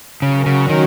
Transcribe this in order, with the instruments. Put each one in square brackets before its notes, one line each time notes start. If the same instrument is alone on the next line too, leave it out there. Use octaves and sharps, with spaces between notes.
[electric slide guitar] C#3 [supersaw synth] F#3 C#4 F#4 A#4
[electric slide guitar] C#3
D#3